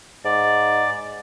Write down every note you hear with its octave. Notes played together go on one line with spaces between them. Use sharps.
G#2 D5